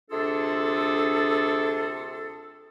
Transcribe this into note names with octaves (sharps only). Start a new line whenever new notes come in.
D2 C3 D4 F4 G#4 A4